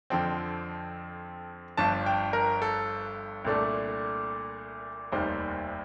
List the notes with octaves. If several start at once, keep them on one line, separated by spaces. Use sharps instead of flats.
F2 D3 F3 C4 G5
G1 G2 F3 A5
G5
A#4
A4
C2 A#2 A3 D4
F1 D#2 D#3 G3 C5